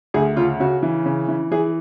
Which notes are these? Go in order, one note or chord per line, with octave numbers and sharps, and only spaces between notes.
D2 G#4
C#3 F4
C#3 F#4
E3
C#3
E3
E3 G#4